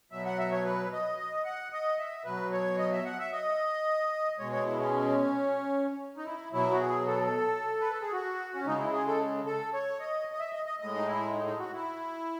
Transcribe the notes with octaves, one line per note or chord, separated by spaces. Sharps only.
B2 F#3 E5
F#5
E5
C#5
B4
D#5
D#5
F#5
D#5
E5
B2 F#3 B4
C#5
D#5
E5
F#5
E5
D#5
B2 G#3 C#5
C#5
E4
C#4
D#4
E4
B2 F#3 E4
F#4
G#4
A4
B4
A4
G#4
F#4
C#4
C#3 G#3 D#4
E4
G#4
A4
A4
C#5
D#5
D#5
E5
D#5
D#5
A2 G#3 D#5
D#4
E4
D#4
D#4
F#4
E4